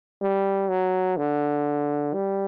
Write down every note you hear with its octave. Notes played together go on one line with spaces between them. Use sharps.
G3
F#3
D3
G3